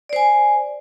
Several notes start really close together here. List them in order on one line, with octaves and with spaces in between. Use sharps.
D5 C5 G#5